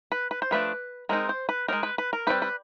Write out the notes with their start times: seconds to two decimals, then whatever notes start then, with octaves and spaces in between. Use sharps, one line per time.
0.12 B4
0.31 B4
0.42 C5
0.51 F3 A3 D4 B4
1.09 G#3 C4 D#4 A#4
1.29 C5
1.49 B4
1.68 C4 D#4 A#4
1.73 G#3
1.83 B4
1.98 B4
2.13 A#4
2.27 G3 C4 D#4 B4
2.42 B4